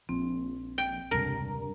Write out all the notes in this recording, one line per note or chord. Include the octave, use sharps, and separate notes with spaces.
A#1 F3 C4
G5
E1 C#2 G2 C3 A#4